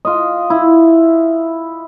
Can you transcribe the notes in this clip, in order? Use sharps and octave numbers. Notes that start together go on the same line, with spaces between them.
F4 D#5
E4